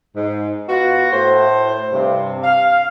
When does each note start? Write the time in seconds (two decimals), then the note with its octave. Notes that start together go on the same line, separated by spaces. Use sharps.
0.16 G#2
0.68 B3 F4 F#4
1.11 A2 C5
1.92 G2 C3
2.43 F5